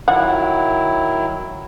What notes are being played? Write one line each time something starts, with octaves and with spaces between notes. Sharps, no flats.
D#3 F#3 E4 F4 F#5